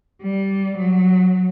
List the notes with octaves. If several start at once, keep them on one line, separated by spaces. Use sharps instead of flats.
G3
F#3